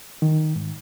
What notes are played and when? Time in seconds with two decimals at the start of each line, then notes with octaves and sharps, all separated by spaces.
0.22 D#3
0.56 G#2